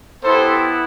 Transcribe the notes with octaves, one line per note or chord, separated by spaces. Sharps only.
B3 E4 G4 A4 C5